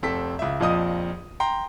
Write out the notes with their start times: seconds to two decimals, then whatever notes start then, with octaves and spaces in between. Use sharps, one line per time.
0.03 F1 C4 A4 B6
0.39 C#2 E5
0.60 A#1 F2 F3 D#5 D#6
1.40 G5 A#5 C6